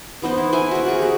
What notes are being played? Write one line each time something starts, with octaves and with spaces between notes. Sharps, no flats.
E3 B3 D#4 C5
E4
E4 C5 G#5
F#4 A#4
F#4 G#4
F#4 G4